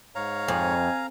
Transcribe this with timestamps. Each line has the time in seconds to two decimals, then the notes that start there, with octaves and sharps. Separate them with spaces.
0.15 G#2 C#5 F5 A#5
0.48 F2 G#5